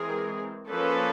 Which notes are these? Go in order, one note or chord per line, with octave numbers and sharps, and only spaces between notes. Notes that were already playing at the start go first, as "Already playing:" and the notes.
Already playing: E3 G#3 C4 G#4 A#4
F3 A#3 C#4 A4 B4